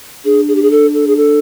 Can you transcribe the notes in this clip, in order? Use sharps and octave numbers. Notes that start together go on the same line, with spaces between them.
D4 G#4
G#4
G4
G#4
A4
A4
G#4
A4